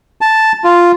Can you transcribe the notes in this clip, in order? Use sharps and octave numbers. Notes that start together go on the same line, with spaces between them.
A5
F4